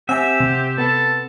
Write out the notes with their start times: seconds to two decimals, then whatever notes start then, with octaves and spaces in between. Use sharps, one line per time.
0.09 C4 G4 E5 F#5 G#5 E6
0.40 C3
0.78 B3 A4